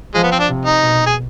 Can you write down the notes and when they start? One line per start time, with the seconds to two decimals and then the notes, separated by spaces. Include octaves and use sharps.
0.14 F3 G#3
0.23 B3
0.32 C4
0.39 D4
0.48 C3
0.65 D#4
0.82 B2
1.06 G#4